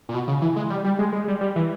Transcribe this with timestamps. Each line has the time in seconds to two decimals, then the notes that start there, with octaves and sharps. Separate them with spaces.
0.09 A#2
0.14 B2
0.28 C#3
0.42 E3
0.56 G#3
0.70 G3
0.84 G3
0.99 G#3
1.13 G#3
1.28 G3
1.41 G3
1.56 E3